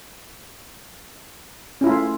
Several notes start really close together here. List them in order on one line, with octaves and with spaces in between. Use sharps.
C#4 E4 F4 A3